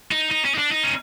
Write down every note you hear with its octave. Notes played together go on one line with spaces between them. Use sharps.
D#4
D#4
C#4
D#4
D4
D#4
C#4